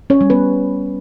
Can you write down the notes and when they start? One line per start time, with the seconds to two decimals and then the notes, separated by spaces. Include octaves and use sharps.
0.10 C#4 C#5
0.21 G3
0.30 B3 B4